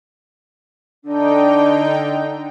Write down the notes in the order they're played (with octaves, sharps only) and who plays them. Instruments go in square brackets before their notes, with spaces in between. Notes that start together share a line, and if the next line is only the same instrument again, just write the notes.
[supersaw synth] D3 D#4 G5 [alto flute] D4